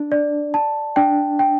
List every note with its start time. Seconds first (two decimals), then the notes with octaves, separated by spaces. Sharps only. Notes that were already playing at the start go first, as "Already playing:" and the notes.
Already playing: D4
0.12 D5
0.54 A5
0.96 D4 G5
1.39 G5